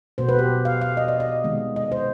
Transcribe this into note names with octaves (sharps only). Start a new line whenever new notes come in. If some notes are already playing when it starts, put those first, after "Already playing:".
B2 B3 C5
B4
G4
F5
F5
D#5
D5
D#5
C3 D#3 G#3 B3
D#5
C5